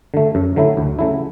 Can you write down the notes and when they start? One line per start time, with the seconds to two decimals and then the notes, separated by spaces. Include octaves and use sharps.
0.14 D3 A3
0.35 F#2
0.56 D3 F#3 A3 E4
0.77 D2
0.99 C#3 F#3 A3 E4